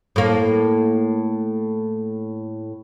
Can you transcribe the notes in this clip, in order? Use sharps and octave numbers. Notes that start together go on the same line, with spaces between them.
A2 A#3